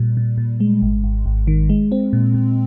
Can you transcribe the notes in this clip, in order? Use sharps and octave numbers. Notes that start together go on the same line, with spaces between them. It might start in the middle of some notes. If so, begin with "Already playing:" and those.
Already playing: A#2 G3
A#2
A#2
G#3
G#1
G#1
G#1
D#3
G#3
C4
A#2
A#2